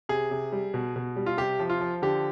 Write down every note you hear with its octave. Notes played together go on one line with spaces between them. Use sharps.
C3 G#4
C3
G3
B2
B2
G3
F4
C3 G4
F3
F4
F3
D3 G4